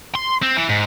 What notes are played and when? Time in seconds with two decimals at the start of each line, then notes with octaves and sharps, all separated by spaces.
0.16 C6
0.43 C4
0.57 E3
0.69 G#2